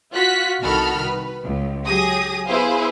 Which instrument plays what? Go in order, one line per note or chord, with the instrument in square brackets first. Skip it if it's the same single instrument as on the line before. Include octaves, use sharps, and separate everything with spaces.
[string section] F4 F#4 F#6 B6
C2 D#3 F#4 A4 B5 F6
B4
C#2
F#3 G4 G#4 D#6 A#6
B3 E4 G#4 B4 C5 F5